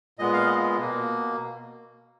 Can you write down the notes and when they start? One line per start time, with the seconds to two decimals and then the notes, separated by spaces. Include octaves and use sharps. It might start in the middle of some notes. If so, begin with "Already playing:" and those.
0.19 A#2 G#3 B3 D#5
0.33 F5
0.46 D#5
0.77 B2 A#3